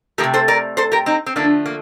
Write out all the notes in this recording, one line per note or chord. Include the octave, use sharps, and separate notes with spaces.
F3 A3 G4 A#4
C3
A4 C5
A#4 D5
A4 C5
G4 A#4
C4 D#4
C4
D3 F3 A3 A#3 D4
A#3